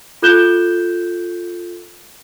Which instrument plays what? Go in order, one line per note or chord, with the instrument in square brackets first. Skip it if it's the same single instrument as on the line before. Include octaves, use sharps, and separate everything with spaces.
[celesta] F4 A4 F#6 G6 E7 G7